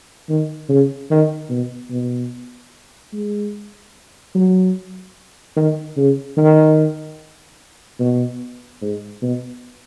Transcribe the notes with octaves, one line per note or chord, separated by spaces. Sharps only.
D#3
C#3
D#3
B2
B2
G#3
F#3
D#3
C#3
D#3
B2
G#2
B2